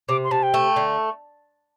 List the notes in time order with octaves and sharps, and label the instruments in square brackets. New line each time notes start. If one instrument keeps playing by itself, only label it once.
[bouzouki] C3 [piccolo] D6
[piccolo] C6
[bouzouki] C3 [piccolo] A5
[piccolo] G5
[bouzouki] A3
D3